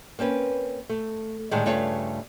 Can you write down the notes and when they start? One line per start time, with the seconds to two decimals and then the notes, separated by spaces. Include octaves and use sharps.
0.19 A#3 C4 C#4 B4
0.89 A3
1.51 A2 D3 D#3 G3 G#3
1.66 G2 C#3 A3 F4 C#5 F5